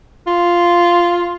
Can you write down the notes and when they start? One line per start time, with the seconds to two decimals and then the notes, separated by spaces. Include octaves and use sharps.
0.27 F4